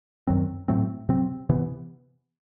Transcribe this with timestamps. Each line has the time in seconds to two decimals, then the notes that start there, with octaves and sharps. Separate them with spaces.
0.27 F#2 D#3 F#3 C4
0.68 A2 F#3 A3 C4
1.09 C3 F#3 C4
1.49 C3 E3 B3